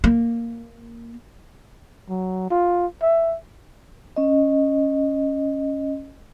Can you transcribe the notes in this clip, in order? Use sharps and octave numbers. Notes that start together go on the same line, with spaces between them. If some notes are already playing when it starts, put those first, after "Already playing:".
A#3
F#3
F4
E5
C#4 D#5